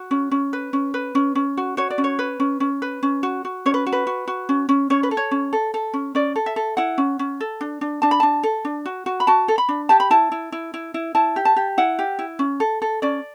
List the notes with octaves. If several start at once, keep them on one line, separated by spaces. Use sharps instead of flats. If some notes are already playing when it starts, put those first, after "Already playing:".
Already playing: F#4
C#4
C#4
B4
C#4
B4
C#4
C#4
F#4
F#4 C#5
D5
C#4
C#5
B4
C#4
C#4
B4
C#4
F#4
F#4
C#4 C#5
B4
F#4
B4
F#4
F#4
C#4
C#4
C#4 C#5
B4
A4
C#5
C#4
A4
A4
C#4
C#4 D5
A4
E5
A4
E4 F#5
C#4
C#4
A4
D4
D4
D4 A5
B5
D4 A5
A4
D4
F#4
F#4
B5
F#4 A5
A4
B5
D4
G4 A5
B5
E4 A5
E4
E4
E4
E4
E4 A5
G4
A5
G4
E4 F#5
G4
E4
C#4
A4
A4
C#4 D5